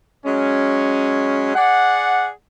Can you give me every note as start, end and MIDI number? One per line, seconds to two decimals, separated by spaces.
0.24 1.53 54
0.24 1.53 56
0.24 1.53 61
1.55 2.27 68
1.55 2.27 74
1.55 2.27 78